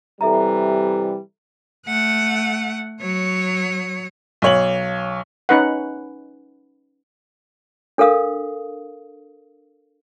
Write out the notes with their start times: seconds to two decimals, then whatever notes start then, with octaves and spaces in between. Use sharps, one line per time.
0.21 C3 E3 G3 A4 E5 A#5
1.87 A3 F#5
3.01 F#3 C#5
4.42 B1 C#5 F#7
5.49 C#4 D#4 B4 F#5
7.98 D4 A4 A#4 F5 D#6